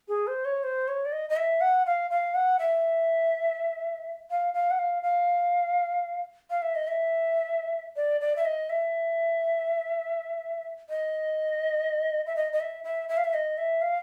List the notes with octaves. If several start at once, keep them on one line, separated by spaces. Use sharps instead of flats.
G#4
C5
C#5
C5
C#5
D5
D#5
D#5
E5
F#5
F5
F5
F#5
E5
F5
F5
F#5
F5
F5
F5
E5
D#5
E5
D5
D5
E5
D#5
E5
D#5
E5
D#5
D#5
E5
E5
E5
F5
E5
D#5
E5
F5